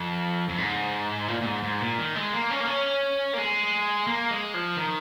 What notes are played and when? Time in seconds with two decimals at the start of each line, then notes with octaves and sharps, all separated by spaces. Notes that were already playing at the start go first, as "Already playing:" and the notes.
Already playing: F2
0.49 F2
0.58 G#2
1.28 A#2
1.41 A#2
1.46 G#2
1.63 G#2
1.81 A#2
1.99 D#3
2.16 G#3
2.33 A#3
2.51 C#4
2.60 A#3
2.67 C#4
3.34 A#3
3.38 G#3
4.07 A#3
4.31 G#3
4.54 F3
4.77 D#3